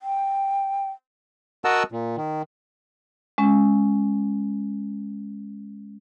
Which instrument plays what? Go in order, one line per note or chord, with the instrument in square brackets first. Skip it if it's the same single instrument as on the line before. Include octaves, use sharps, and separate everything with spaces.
[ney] G5
[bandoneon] F#4 A#4 D#5 F#5 A5 E6
A#2
D#3
[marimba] G#3 C#4